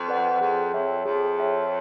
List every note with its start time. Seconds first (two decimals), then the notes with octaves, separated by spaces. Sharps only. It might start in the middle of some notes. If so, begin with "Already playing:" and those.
Already playing: F2
0.09 B4 D5 F#5
0.41 F2 G#4
0.74 F2 C#5 E5 G5
1.05 F2 G#4
1.38 C#5 E5 G5